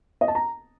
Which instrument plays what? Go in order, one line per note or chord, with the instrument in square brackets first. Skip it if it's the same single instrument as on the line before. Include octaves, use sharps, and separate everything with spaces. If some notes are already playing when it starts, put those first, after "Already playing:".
[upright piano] D#5
A5
A#5